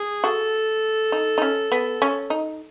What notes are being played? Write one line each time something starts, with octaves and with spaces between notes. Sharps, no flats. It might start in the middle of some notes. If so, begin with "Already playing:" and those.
Already playing: G#4
F#4 A4
D#4
D#4
C#4
B3
C#4
D#4